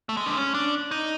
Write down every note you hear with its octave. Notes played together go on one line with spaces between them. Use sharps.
A3
G#3
D4
C#4
D4
D#4